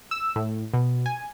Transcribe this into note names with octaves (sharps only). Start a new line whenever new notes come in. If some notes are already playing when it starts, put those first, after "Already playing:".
E6
A2
B2
G#5